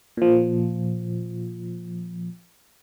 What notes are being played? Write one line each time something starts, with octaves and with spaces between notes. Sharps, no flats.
A#2 F3